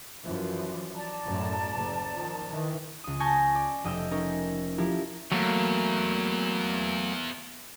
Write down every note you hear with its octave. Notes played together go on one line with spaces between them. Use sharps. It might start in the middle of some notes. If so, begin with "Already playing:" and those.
F#2 E3 F3
D5 A5 A#5
F#2 A2
F#1
D#3 F3
D#3 E3
C#2 D#6
G#5 A5 C#6 G6 A6 A#6
D5
F1 D#5 G5 E6
C#4 D#4 A#4
F3 E4 G4 A#4
E2 F#3 A3 A#3